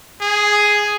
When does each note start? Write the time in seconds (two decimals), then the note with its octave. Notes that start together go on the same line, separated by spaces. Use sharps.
0.21 G#4